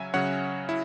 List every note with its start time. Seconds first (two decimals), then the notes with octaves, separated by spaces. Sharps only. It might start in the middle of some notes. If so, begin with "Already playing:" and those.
Already playing: C#3 F#3 C#4 E5 G#5
0.14 C#3 F#3 C#4 C#5 F#5
0.69 E4